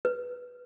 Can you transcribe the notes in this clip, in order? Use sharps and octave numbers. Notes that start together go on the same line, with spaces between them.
B4